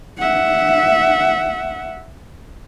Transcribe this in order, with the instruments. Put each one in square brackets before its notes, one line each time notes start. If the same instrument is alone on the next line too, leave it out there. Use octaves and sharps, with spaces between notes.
[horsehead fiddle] E5 F#5